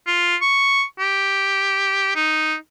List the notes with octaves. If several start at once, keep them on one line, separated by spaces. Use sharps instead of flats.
F4
C#6
G4
D#4